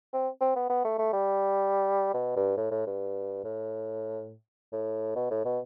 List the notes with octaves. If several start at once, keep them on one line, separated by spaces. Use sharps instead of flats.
C4
C4
B3
B3
A3
A3
G3
B2
G2
A2
A2
G2
A2
A2
B2
A2
B2